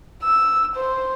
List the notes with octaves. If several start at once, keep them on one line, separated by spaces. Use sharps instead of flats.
E6
C5